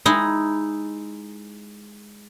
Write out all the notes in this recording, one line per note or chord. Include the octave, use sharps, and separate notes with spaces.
G#3 D#4 E4